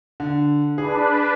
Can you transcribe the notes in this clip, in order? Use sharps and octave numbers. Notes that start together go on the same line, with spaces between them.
D3
D4 G#4 B4